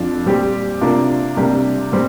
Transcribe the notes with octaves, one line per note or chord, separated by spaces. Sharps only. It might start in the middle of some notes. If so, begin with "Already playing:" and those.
Already playing: F2 F3 D4 F4
A#2 G3 C4 G4
C3 A#3 D4 F4
C3 G3 A#3 D4 G4
A#2 G3 C4